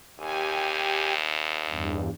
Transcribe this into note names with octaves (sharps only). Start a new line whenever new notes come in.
D#2 G4 G#5
E2 G2